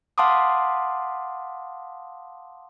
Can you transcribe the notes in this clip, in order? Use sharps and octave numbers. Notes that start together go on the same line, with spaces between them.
F5 F#5 A5 C6 D6 D#6